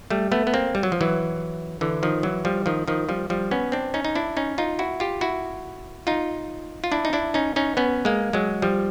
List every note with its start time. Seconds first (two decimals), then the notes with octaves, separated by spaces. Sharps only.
0.10 G3 A3
0.32 A3 B3
0.47 B3
0.54 A#3 C4
0.75 G3
0.83 F#3
0.92 F3
1.01 E3 F#3
1.81 D3 E3
2.03 D#3 F3
2.23 E3 F#3
2.45 F3 G3
2.66 D#3 F3
2.88 D#3 F3
3.09 F3 G3
3.30 F3 G3
3.51 B3 C#4
3.72 C4 D4
3.94 C#4 D#4
4.05 D#4
4.16 D4 E4
4.37 C#4 D#4
4.58 D#4 F4
4.79 E4 F#4
5.00 F4 G4
5.21 E4 F#4
6.07 D#4 F4
6.84 F4
6.92 D4 E4
7.05 D#4
7.13 D4 E4
7.34 C#4 D#4
7.56 C#4 D#4
7.77 B3 C#4
8.05 G#3 A#3
8.33 F#3 G#3
8.62 F3 G3